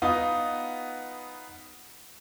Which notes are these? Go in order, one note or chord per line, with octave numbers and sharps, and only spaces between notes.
B3 D#4 F4 D#6